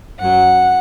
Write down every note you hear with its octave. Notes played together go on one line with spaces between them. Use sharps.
F#2 F#3 F#5